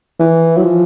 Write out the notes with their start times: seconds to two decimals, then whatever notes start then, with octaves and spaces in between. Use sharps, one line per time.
0.20 E3
0.57 F#3
0.64 F3